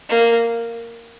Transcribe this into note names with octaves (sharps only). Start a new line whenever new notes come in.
A#3